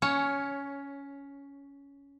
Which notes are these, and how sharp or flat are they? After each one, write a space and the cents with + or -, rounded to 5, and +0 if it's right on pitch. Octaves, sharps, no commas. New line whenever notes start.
C#4 +15 C#5 +0